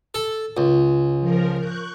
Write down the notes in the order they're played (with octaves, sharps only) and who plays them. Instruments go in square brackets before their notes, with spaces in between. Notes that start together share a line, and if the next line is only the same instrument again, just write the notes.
[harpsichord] A4
C#2
[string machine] F3 A#4
C#6 F#6 G6